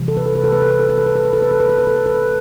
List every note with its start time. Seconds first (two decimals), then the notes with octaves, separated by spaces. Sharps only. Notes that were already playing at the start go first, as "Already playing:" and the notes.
Already playing: C3 E3 G3
0.08 A4
0.17 B4
0.26 A4
0.35 B4
0.44 A4
0.52 B4
0.62 A4
0.71 B4
0.80 A4
0.89 B4
0.98 A4
1.06 B4
1.16 A4
1.25 B4
1.33 A4
1.42 B4
1.51 A4
1.60 B4
1.70 A4
1.78 B4
1.87 A4
2.06 B4